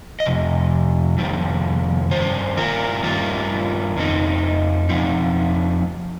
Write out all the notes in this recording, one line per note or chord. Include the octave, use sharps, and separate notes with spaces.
D#5
F2 C3
F2 C3 D#3 C4
G2 D#3 C5
F4 A#4
G2 D#3 G3 F4 A#4
F2 F3 C4 D#4
F2 F3 C4 D#4